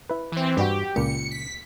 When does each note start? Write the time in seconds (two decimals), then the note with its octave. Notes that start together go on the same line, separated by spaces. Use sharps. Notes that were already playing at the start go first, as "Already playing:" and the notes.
0.10 E4 B4
0.32 E3 C4
0.57 G2 G3 F#4 G4
0.96 C#2 A#2 C#7
1.31 B6